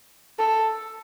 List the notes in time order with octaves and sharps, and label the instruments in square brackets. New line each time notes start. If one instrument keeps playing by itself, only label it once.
[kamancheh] A4